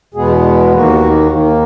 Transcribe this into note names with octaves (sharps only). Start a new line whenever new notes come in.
E2 B2 G#3 B3 G#4
D#2 D#3 A#3 F#4
D#2 D#3 A#3